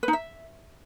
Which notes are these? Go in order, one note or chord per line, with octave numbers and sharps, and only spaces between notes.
B4
D#4
E5